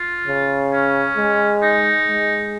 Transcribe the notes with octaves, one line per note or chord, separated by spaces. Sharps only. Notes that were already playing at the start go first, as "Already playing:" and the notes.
Already playing: F4
C#3
C#4
G#3
D#4
G#3